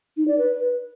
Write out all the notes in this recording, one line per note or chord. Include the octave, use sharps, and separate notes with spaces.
D#4
D5
B4